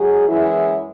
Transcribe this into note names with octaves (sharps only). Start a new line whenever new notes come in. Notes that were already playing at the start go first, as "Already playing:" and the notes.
Already playing: G#2 F#3 G#4
F#2 E3 G#3 E4